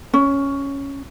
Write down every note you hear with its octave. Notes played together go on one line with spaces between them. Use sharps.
C#4